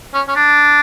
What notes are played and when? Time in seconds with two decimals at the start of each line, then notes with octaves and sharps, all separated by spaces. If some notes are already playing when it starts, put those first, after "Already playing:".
0.14 C#4
0.28 C#4
0.36 D4